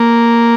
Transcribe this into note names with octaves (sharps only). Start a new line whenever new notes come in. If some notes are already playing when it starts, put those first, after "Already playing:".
Already playing: A#3